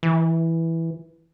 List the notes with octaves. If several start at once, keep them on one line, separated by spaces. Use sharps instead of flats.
E3